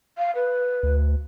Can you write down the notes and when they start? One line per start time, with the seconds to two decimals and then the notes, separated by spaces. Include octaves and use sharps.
0.18 F5
0.35 B4
0.83 D2